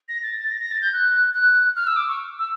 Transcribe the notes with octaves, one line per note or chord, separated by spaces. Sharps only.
A#6
A6
A6
A#6
A#6
A6
G6
F#6
F#6
F6
E6
D6
C#6
E6